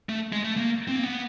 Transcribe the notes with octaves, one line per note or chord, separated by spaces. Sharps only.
A3
G#3
A3
A#3
C4
A#3
B3